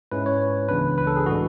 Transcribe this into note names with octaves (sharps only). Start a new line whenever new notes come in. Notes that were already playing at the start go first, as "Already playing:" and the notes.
G#2 G#3 C#4 E4 B4
C#5
C#2 C#3 E3 B3 D4 B4
B4
A4
G#4
A2 E3 G#3 D4 F#4